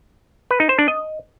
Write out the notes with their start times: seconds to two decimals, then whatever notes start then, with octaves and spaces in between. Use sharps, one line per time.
0.51 B4
0.60 D#4
0.69 C5
0.79 D4
0.88 D#5